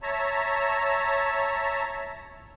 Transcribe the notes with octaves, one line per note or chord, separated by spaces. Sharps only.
C#5 E5 A5 A#5